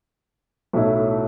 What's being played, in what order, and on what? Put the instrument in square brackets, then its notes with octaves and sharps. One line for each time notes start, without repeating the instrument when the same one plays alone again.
[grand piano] B1 A2 F#3 A3 E4